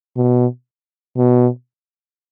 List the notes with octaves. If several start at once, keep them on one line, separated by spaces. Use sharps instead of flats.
B2
B2